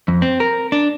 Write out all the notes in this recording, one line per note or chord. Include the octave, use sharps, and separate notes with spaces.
F2
C4
A#4
D4